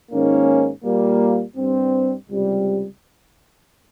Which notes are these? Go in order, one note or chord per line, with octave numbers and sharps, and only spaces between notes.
G#2 D#3 A#3 C#4
A#2 G3 A#3
G2 G3 C4
C#2 C3 G3